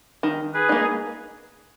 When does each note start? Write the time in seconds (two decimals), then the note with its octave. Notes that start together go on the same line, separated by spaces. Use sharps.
0.23 D#3
0.54 G#4 B4
0.69 A#3 D#4